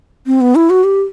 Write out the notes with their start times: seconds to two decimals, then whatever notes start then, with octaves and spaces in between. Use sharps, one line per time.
0.26 C4
0.41 B3
0.55 E4
0.70 F#4
0.84 G4